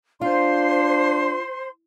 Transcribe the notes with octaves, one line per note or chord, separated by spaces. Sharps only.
D4 F4 C5 C6